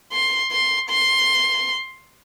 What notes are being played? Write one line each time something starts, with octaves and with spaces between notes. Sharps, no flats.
C6
C6
C6